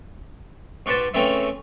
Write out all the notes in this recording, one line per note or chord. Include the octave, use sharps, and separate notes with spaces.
G#2 F#4 G4 B4 C5 A5
C#3 E3 A3 C4 C#4 E4